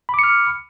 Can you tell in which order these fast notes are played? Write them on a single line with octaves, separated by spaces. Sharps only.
B5 D6 C#7 F6